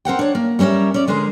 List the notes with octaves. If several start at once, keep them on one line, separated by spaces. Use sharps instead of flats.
C4 A#4 F#5 G5
D4 C#5
A#3
G3 B3 C#4 A#4 E5
C#4 D5
D3 G#3 G#4 A#4 C5